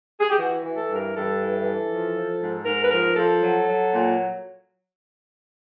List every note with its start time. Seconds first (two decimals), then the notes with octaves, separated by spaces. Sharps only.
0.20 G#4
0.30 G4
0.38 E3 F#4
0.63 E3
0.76 A4
0.89 G2
0.95 A#4
1.14 G2 A4
1.39 E3
1.64 E3
1.89 F3
2.15 F3
2.40 G#2
2.65 G#2 A#4
2.84 B4
2.90 F3 A#4
3.16 F3 A4
3.41 F#3
3.67 F#3
3.92 A#2